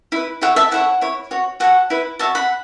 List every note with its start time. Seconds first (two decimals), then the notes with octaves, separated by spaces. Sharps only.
0.12 E4 B4
0.41 E4 A4 C#5 F#5
0.56 E5 A5
0.71 E4 A4 C#5 F#5
1.01 E4 C#5
1.31 F#4 C#5
1.60 F#4 A4 C#5 F#5
1.90 E4 B4
2.19 F#4 E5 A5
2.23 C#5
2.35 F#5 B5